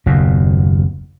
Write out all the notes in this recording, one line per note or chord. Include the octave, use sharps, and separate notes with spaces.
F#1 D#2 B2